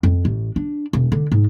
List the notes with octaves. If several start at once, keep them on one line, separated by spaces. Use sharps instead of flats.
F2
A1
D4
E1
D3
G#2